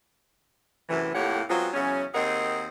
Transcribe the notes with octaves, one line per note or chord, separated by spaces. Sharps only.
F#2 A2 C3 E3
F2 A2 A#3 G4 C#5 F#5
F#3 G#3 B3 C4 F4
E2 C#3 F#3 C#4
D#2 C4 G#4 A#4 D#5 F#5